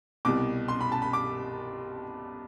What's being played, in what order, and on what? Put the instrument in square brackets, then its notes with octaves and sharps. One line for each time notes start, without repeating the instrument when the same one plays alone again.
[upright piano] C2 B2 G3 D6
C6
B5
A5
B5
D6